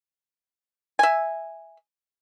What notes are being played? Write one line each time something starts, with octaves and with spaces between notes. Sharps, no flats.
E5 G#5